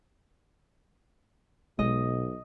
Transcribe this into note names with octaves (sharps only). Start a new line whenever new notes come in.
B1 B2 G#3 D#5